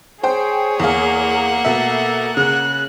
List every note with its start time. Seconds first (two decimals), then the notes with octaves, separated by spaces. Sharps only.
0.23 G#4 C5 C#5 G5
0.80 E2 A#3 F5 F#5
1.65 B2 A3 A4 E5
2.37 C#3 C#4 F#6